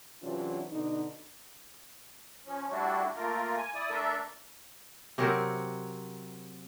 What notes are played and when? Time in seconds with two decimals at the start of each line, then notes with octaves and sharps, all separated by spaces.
0.21 C3 E3 F#3 C#4 D4 F4
0.70 B2 D3 D4 D#4
2.46 F3 C#4
2.71 G3 A3 D4 E4 F#4
3.16 A3 A#3 F4 A#4
3.56 G#5
3.75 E4 D5 D#6
3.90 A3 D4 A4 A#4 E5
5.18 C3 F#3 C4 A#4